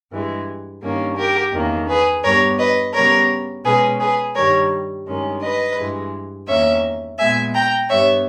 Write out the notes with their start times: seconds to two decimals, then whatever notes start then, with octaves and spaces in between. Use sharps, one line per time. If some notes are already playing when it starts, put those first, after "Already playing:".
0.11 G2 E3 G#3
0.81 G2 D#3 A#3 C#4
1.17 G4 A#4
1.53 E2 D#3 A#3 C#4
1.87 G#4 B4
2.23 G2 G3 B3 A#4 C#5
2.58 B4 D#5
2.93 C#3 G3 B3 A#4 C#5
3.64 B2 G#3 C#4 G#4 B4
4.00 G#4 B4
4.35 G2 D#3 G3 A#4 C#5
5.06 G2 D#3 G#3 C#4
5.41 B4 D#5
5.77 G2 E3 G#3
6.48 E2 D#3 A#3 C#4 C#5 E5
7.18 A#2 G#3 B3 E5 G#5
7.54 G5 A#5
7.89 G2 G3 B3 C#5 E5